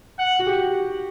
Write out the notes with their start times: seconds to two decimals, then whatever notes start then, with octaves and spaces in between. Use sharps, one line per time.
0.19 F#5
0.39 F#4
0.47 G4